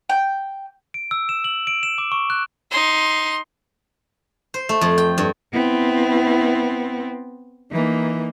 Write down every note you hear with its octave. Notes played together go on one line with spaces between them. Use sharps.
G5
D7
E6
E7
F#7
D7
E7
D6
C#6
F#6
D#4 C6
C5
A3
F2
G5
G2
B3 C4 E4
E3 A#3 D#4